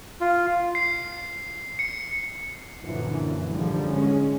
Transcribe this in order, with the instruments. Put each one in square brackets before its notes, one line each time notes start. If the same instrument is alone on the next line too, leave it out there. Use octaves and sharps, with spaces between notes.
[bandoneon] F4
[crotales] C7
C#7
[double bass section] F#2 A#2 D3 E3 F3
G#2 D3 F3 G3
G#3 C#4